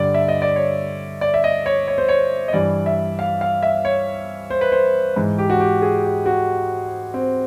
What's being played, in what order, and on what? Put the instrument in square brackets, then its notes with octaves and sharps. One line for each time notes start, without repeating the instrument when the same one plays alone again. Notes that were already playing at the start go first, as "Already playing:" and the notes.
Already playing: [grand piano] G2 D3 D5
E5
D#5
D5
C#5
D5
E5
D#5
C#5
C#5
C5
C#5
D#5
G2 E3 D5
E5
F5
F5
E5
C#5
C5
B4
C5
G#2 E3
G4
F#4
G4
G#4
G4
F#4
C4